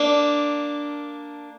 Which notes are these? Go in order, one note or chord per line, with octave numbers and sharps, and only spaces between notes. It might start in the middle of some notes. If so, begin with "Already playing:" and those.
Already playing: A#3 D4